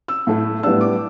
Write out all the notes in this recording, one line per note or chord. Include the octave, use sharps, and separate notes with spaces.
E6
A2 A3 E4
A2 G3 B3 D4 E6
D6